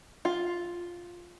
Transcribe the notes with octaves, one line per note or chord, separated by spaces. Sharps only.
F4